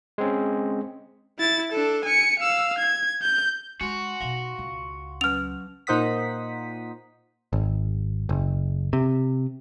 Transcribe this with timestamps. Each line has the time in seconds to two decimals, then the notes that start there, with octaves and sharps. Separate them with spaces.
0.18 G#3 C4 C#4
1.39 E4 A6
1.72 D4 A4
2.05 G#5 C#7
2.40 F5 E6
2.78 G#6
3.22 G6
3.81 G#3 F#4 G#5 C6
4.21 B2 D#4 F5 C6
4.59 C#2 C#3
5.21 F#3 C#4 F6 F7
5.87 A#2 D#4 C5 F#5 D#6 B6
7.53 G#1
8.29 F#1
8.93 C3